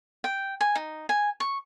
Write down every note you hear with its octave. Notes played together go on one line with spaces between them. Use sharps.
G5
G#5
D#4
G#5
C#6